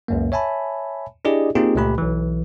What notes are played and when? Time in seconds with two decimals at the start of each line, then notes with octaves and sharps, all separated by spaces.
0.08 C#2 F#2 A#3
0.32 C#5 E5 G#5 A5 B5
1.25 D4 E4 G4 G#4 D5 D#5
1.55 A#3 C4 D#4 F4 G4 G#4
1.76 C#2 A#2 A3 G4 B5
1.98 B1 E3